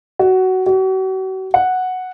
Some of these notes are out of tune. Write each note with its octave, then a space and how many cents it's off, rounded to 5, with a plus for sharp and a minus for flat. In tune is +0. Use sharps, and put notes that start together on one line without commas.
F#4 +15
F#4 +40
F#5 -5